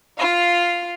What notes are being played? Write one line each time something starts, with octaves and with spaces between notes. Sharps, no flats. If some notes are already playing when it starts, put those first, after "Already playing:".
F4 F5